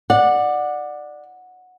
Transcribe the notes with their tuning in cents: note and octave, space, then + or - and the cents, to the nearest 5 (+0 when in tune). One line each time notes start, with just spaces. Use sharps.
D5 +15 F#5 -10